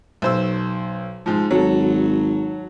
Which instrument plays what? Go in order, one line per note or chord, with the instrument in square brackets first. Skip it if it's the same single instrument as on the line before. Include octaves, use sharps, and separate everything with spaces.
[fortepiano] B1 C5 E6
G#2 F3
[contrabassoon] G#1 [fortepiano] F#3 A4